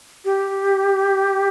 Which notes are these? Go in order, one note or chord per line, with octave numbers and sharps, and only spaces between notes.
G4